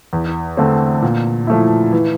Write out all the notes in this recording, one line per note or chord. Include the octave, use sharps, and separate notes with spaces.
E2
D3 A3 C4
A#2
F3 A3 E4
E3